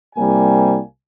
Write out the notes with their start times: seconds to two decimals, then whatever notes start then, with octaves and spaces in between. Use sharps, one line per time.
0.15 C2 C3 G3 A#3 G#5